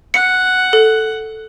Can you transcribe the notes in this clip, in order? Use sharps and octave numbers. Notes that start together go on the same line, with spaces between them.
F#5 C#7
A4